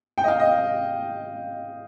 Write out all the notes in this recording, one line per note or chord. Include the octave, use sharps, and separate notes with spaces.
G5
D#5
F5
D#5